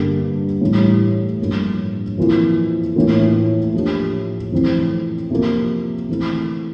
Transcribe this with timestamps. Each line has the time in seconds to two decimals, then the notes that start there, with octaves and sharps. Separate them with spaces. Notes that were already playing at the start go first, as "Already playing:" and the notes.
Already playing: G2 D3 G3 A#3
0.61 A2 E3 G3
1.40 G2 F3 A#3
2.18 F2 E3 A#3 F4
2.96 A2 E3 A#3 F4
3.74 F3 A#3 D4 G4
4.52 F2 C3 E3 A3 C4
5.31 C3 F3 A#3
6.09 E3 A3 C4